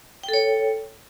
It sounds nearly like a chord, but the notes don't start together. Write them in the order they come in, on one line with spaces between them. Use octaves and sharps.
G5 A4 C#5